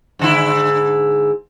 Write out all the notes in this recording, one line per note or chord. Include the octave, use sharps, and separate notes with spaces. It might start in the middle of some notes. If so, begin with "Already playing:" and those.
G#2 D3 E4